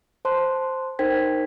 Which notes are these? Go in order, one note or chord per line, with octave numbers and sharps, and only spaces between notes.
C5 A5 C6 F#6
D#4 A#4 C5 G5 G#6 B6